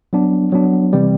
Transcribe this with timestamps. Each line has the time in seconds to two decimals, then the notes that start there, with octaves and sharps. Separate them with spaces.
0.13 F#3 B3 D4
0.52 F#3 B3 D4
0.93 C3 E3 G3 C4